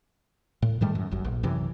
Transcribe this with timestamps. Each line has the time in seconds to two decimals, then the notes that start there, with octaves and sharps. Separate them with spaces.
0.62 A2
0.81 G#2 D#3 G3 A3
0.95 F#2
1.11 G1 F#2
1.25 A#1
1.43 F#2 C3 E3